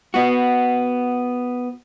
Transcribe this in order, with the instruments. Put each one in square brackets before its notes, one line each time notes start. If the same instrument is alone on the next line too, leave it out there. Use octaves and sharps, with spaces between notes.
[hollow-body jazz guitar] B3 F#4